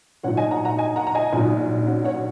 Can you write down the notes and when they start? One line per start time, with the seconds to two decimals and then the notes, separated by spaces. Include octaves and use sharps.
0.23 A#1 G#2 F#3 C#5 F#5
0.37 D#5 G#5
0.51 F#5 A#5
0.65 F#5 A#5
0.78 D#5 G#5
0.96 F#5 A#5
1.07 A#5
1.15 D#5 G#5
1.33 A#1 G#2 F#3
1.87 C#4 F#4
2.05 C#5 F#5